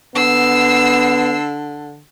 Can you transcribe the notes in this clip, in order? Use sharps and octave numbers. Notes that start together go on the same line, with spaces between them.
D3 B3 E6 C7